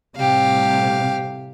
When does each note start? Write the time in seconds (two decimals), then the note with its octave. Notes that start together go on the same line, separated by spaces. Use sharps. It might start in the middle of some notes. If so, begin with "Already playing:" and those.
0.16 A2 C3 G3 G4 F5